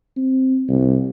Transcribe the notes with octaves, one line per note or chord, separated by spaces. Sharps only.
C4
C2